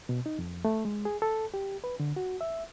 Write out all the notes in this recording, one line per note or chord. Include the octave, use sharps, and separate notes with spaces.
B2
D#4
F2
A3
G#3
G#4
A4
G4
B4
D3
F#4
E5